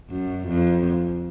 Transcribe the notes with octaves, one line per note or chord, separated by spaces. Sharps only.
F#2
F2